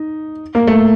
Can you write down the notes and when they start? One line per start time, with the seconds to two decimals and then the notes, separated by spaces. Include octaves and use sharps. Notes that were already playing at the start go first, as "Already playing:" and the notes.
Already playing: D#4
0.55 A#3
0.67 A3